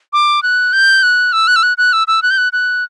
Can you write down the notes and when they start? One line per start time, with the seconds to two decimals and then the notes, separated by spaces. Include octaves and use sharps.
0.13 D6
0.43 F#6
0.73 G6
1.03 F#6
1.33 E6
1.48 F#6
1.56 E6
1.63 F#6
1.78 F#6
1.93 E6
2.08 E6
2.23 F#6
2.31 G6
2.38 F#6
2.53 F#6